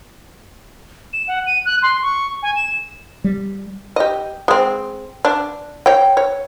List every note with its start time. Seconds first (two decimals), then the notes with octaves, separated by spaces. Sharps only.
1.13 E7
1.28 F#5
1.47 D#7
1.65 F#6
1.82 C6
2.03 C#6
2.43 G#5
2.56 E7
3.24 G3
3.96 G4 D#5
4.48 G#3 C4
5.25 D4
5.86 C#5 G5
6.17 C#5